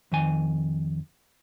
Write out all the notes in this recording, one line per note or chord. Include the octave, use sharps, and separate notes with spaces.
F2 D#3 G#5